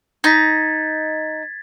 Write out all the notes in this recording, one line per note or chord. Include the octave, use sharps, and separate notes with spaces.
D#4 G#6 A6 B6